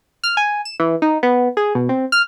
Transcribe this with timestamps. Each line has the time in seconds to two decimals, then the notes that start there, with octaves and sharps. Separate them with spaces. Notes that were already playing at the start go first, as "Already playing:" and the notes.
0.24 F6
0.37 G#5
0.65 E7
0.80 E3
1.02 D#4
1.23 B3
1.57 G#4
1.75 B2
1.89 C4
2.12 F6